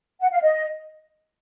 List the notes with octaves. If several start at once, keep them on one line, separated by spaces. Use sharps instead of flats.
F#5
F5
D#5